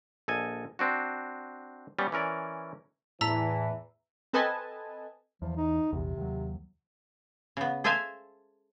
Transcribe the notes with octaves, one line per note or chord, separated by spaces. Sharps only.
A#1 A4 D#5 G#5
C4 D4 F#4
G3 B3 C#4
E3 C#4 A#4 D5
E2 A2 E3 A5 A#5 E6 B6
C4 A4 B4 D#5 G#5 A5
E2 F3
D#4
A#1 E2 C3
D#2 F#3
C#3 B3
G#4 A4 C5 E5 F5 G#5